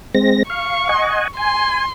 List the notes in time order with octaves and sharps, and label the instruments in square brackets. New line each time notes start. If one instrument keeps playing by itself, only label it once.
[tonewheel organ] G#3 C4 A#6
[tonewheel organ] F5 [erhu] C#6
[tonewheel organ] D#5 F#5 G#5
[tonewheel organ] G#5 [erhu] C6